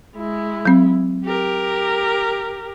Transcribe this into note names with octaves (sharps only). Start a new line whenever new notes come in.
G#3 E4
F#3 C4
G4 A#4